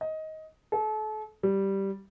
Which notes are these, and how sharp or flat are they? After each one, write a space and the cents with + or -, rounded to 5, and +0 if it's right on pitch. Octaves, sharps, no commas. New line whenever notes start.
D#5 +15
A4 -35
G3 -5